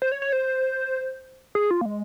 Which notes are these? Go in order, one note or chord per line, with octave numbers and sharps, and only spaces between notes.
C5
C#5
C#5
C5
G#4
F4
A#3
G#3